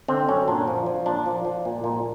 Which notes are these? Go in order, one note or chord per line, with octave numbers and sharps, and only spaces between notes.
D3 C4
F#2 C#4
A#2 D4
F3
F3
A#2 D4
F3
F3
A#2
A#2